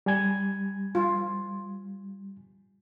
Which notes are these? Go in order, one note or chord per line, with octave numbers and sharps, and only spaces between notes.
G3 G#5 G#6
F4